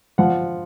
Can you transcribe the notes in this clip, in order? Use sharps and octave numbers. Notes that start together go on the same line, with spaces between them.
F3 F#5